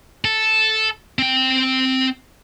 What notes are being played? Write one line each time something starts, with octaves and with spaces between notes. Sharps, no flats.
A4
C4 G5